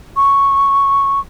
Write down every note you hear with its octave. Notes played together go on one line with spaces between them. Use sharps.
C#6